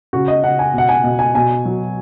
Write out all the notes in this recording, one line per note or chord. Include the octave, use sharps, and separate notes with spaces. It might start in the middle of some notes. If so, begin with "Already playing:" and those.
C#3 F#4
D#5
C#3 F#5
G#5
B2 F#5
G#5
B2
G#5
B2 G#5
F#3